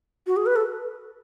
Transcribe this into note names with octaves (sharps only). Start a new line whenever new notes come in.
F#4
G#4
B4
A4